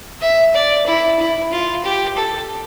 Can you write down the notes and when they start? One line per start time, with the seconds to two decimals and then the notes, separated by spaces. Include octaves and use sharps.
0.21 E5
0.54 D5
0.87 E4
1.19 E4
1.52 F4
1.84 G4
2.16 A4